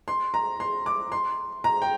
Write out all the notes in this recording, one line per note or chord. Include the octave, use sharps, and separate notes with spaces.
C6
A#5
C6
D6
C6
A#5
G5